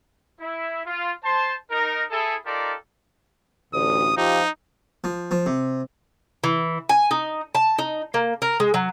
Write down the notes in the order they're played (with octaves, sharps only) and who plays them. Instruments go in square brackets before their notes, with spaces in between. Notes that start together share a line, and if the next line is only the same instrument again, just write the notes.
[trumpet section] E4
F4
C5 A5 C6
D#4 A#4
E4 G#4 A4
D#4 F4 G4 A4 A#4 D5
[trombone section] A1 D2 [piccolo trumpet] D#6
[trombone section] F3 F4 G4 [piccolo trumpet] D#4
[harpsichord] F3
F3
C3
[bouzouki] E3
G#5
D#4
A5
D#4
A#3
A#4
G#3
F#3